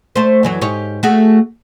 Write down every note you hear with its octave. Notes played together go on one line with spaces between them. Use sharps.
A3 C5
F#2 E3 F#3
G#2 G4 C#5
A3 F#4 G#4